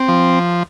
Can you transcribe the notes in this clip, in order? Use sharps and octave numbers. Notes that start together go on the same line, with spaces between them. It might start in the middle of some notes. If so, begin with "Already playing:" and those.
Already playing: C4
F3